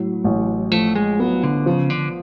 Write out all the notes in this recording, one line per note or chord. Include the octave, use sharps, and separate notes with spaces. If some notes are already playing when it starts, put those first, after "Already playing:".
Already playing: A2 F#3
A1
F3 A3
G#3
F#3 B3
D3
C#3 F3
D3